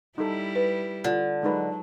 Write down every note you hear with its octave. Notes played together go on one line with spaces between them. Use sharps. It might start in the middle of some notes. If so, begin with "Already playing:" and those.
G3 D#4 E4 A4
B4
D3 F4
F#3 G#3 D#4 B4